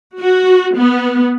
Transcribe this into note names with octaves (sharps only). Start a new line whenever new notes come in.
F#4
B3